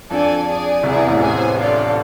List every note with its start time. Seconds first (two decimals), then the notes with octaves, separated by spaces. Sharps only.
0.11 F2 D4 A4 D5 G#5
0.47 G#4 D5 G#5
0.83 C2 C3 E4 G#4 D5
0.96 E2 E3
1.08 A1 A2
1.20 A1 A2 G#4 C5 G#5
1.57 D4 F4 A4 D5